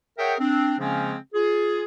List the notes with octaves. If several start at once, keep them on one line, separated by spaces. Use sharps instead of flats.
G#4 A#4 C#5 E5 F#5 G5
C4 D4
C#3 F3 G#3 A#3 C4 C#4
F4 G#4